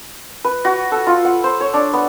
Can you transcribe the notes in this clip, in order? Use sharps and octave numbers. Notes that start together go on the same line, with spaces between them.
B4
F#4
A4
F4
F#5
C5
C#5
D4
B3